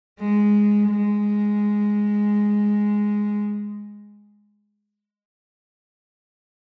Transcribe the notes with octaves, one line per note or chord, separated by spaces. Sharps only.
G#3
G#3